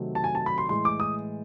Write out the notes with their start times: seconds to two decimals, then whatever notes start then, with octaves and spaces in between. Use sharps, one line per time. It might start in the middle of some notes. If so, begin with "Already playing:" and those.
Already playing: C3 D#3 F#3 A3 C4
0.15 A5
0.24 G#5
0.35 A5
0.46 B5
0.58 C6
0.69 A2 E3 G#3 C6
0.85 D6
1.00 D#6